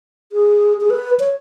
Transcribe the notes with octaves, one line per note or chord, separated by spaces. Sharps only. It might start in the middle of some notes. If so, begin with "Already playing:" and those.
G#4
G#4
B4
C#5